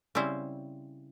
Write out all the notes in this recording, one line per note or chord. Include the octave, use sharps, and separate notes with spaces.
C#3 G3 C4 E4 C5